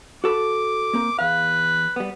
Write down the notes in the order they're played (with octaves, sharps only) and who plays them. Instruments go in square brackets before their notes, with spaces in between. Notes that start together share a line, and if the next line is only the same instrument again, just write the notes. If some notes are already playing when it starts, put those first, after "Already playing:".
[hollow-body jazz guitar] F#4 A4 B5 [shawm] D6
[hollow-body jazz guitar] A#3 C4 A#4
[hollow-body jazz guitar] E2 F5 [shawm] B4
[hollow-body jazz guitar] G3 B3